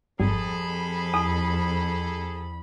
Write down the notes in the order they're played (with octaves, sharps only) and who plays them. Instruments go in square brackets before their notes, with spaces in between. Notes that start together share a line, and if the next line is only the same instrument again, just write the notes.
[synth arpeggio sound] G#1 G3 [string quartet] F2 B5 [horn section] C3 G#4 A4
[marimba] E2 [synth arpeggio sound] D#6